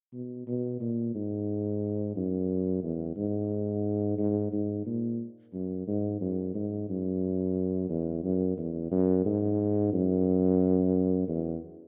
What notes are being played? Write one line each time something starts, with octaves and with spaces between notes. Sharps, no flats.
B2
B2
A#2
G#2
F#2
E2
G#2
G#2
G#2
A#2
F#2
G#2
F#2
G#2
F#2
E2
F#2
E2
F#2
G#2
F#2
E2